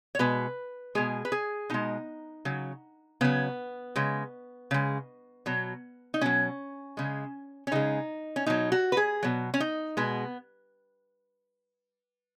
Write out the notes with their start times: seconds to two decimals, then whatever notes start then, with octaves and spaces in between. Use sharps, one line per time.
0.15 C#5
0.19 B2 G#3 B4
0.95 B2 G#3 G#4
1.25 B4
1.32 G#4
1.70 B2 G#3 D#4
2.45 C#3 F#3
3.21 C#3 F#3 B3
3.96 C#3 G#3
4.71 C#3 G#3
5.46 B2 F#3
6.14 D#4
6.21 B2 F#3 C#4
6.97 C#3 G#3
7.67 C#4
7.72 C#3 G#3 D#4
8.36 C#4
8.46 B2 F#3 D#4
8.72 F#4
8.92 B4
8.97 G#4
9.23 B2 F#3
9.54 C#4
9.60 D#4
9.97 B2 G#3 B3